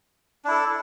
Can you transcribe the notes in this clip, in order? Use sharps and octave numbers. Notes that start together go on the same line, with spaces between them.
D4 E4 A4